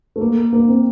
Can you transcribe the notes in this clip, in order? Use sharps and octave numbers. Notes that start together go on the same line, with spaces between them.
A3
A#3
A#3
C4